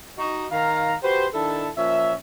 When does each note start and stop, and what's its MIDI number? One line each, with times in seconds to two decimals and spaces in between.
0.18 0.46 63
0.18 0.46 66
0.18 0.46 75
0.51 0.93 51
0.51 0.93 77
0.51 0.93 82
1.02 1.26 66
1.02 1.26 67
1.02 1.26 71
1.02 1.26 72
1.33 1.69 51
1.33 1.69 62
1.33 1.69 64
1.33 1.69 69
1.77 2.13 46
1.77 2.13 53
1.77 2.13 61
1.77 2.13 76